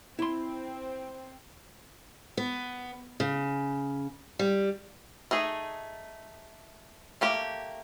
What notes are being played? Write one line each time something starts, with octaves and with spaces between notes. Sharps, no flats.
C4 E4 C6
B3
C#3
G3
A3 D#4 G#4
A3 A#3 G4